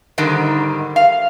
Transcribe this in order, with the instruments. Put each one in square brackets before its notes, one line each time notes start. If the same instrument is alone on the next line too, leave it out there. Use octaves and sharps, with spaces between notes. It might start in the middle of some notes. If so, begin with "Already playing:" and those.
[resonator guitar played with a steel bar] G#2 D3 D#3 G3
F5